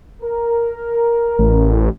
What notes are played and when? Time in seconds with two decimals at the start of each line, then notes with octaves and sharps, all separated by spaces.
0.21 A#4
1.39 A1